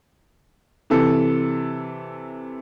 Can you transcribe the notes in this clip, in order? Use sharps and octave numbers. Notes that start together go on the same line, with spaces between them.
C3 E3 A4